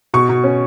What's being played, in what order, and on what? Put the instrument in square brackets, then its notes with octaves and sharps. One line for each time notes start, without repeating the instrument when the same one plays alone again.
[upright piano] B2 C#6
B2
C#4